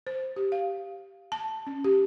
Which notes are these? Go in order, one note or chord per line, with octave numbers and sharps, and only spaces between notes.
C5
G4
F5
A5
C#4
G4